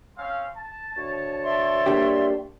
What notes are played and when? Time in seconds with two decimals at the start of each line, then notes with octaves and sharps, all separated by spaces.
0.16 C4 C#4 F5
0.56 A5
0.97 D2 C#5
1.43 D5 E5 C6
1.86 A#3 D4 G4